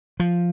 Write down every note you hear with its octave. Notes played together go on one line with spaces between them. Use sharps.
F3